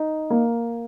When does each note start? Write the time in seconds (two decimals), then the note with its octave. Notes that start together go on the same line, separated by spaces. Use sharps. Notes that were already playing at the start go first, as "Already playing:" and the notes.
Already playing: D#4
0.30 A#3